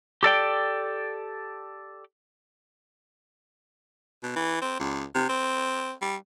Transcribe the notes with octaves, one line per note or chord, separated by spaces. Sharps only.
G4 A4 D5 G5
B2
E3
C4
C#2
C3
C4
G3